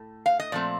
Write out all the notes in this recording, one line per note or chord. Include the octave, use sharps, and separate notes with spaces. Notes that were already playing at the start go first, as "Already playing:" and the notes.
Already playing: A2 A3
F5
D#5
A#2 F3 A3 C4 D5